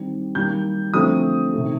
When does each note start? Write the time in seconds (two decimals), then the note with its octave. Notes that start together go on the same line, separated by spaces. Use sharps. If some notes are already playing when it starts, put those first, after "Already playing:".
Already playing: D#3 G3 C4
0.35 D#3 G3 A#3 G6
0.94 D3 F3 A3 C4 D#6
1.54 C3 D#3 A3